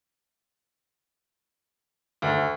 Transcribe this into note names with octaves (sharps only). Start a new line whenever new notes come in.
D2